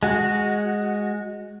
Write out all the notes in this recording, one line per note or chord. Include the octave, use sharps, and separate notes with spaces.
G#3 F#4